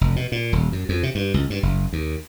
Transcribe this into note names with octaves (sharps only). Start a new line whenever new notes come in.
F1
B2
A#2
D#1
F#2
F2
C3
G2
C#2
G2
F#1
D#2